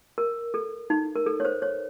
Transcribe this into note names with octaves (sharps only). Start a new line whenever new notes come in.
A#4
A4
D#4
A#4
A4
C#5
C5
C#5